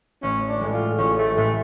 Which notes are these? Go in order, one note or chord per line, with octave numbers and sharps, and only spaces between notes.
A1 C#4
D4
A2 G#3
F4
A1 C#4
A3
A2 G#3 A3